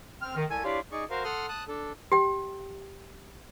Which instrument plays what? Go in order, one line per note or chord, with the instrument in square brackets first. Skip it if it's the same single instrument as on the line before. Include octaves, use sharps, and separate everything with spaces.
[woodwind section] C4 F6
D#3
C2 A4 G#5
D4 E4 F4 G4 C#5 D5
[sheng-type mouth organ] D#4 G#4 D5 C#6
F#4 A#4 C5 F5
A4 F#5 C6 D#6 F6
A5 D#6 F#6
D4 A4
[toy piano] G4 G5